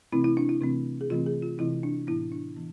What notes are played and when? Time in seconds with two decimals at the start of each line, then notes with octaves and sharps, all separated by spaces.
0.12 C3 E3 A3 C4 E4
0.24 E4
0.37 D4
0.49 E4
0.61 C3 E3 A3 C4
1.01 G#4
1.10 C3 E3 A3 C4 F4
1.26 G#4
1.42 F4
1.58 C3 E3 A3 C4 E4
1.83 D4
2.07 A2 E3 B3 E4
2.32 D4
2.57 E3 B3